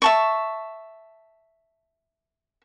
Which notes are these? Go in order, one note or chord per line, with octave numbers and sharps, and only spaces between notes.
E5 A5 C#6